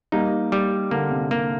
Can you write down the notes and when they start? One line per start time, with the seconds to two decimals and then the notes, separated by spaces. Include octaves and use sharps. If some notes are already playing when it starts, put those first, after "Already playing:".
0.12 G3 A#3 D#4
0.52 G3
0.91 D3 A#3
1.11 C3
1.30 D3 A#3